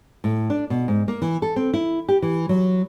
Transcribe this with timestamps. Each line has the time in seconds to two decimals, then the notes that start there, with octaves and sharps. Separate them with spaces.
0.24 A2
0.50 D4
0.70 B2
0.88 G#2
1.08 A#3
1.22 E3
1.42 A4
1.56 C4
1.74 E4
2.09 G4
2.22 E3
2.49 F#3